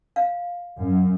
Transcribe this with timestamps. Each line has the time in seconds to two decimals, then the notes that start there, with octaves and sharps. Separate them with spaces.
0.16 F5
0.78 F#2